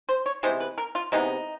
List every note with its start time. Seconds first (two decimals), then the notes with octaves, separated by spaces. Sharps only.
0.09 C5
0.26 C#5
0.43 C3 E3 G#3 B3 C5
0.60 B4
0.78 A#4
0.95 F4
1.12 C3 E3 G#3 B3 D#4